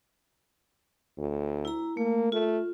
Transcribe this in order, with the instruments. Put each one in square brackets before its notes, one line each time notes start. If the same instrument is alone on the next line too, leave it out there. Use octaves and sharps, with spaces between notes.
[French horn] D2
[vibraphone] E4 A#5
[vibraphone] A3 [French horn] A#3
[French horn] A3 [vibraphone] F4